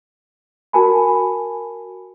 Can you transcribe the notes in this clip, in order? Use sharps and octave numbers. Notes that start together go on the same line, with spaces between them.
F#4 A#4 G#5 A5 B5